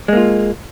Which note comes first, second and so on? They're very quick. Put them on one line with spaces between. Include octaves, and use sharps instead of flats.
G#3 A#3 F4